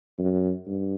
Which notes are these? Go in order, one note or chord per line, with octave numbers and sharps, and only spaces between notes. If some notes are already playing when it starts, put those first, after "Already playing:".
F#2
G2